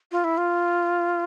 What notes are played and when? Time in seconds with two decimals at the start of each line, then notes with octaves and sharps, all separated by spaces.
0.12 F4
0.24 E4
0.38 F4